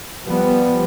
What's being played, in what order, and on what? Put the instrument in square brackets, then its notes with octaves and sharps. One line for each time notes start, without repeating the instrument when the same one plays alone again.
[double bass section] F3 G3 B3